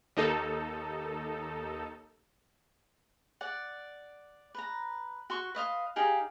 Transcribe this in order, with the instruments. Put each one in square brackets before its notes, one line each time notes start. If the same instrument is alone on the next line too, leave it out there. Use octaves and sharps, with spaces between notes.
[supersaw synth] D#2 D#4 A4
[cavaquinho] D5 F#5
B4 A#5
F#4 C6 C#6
B4 D#5 F5 C6
D#4 G4 G#4 F5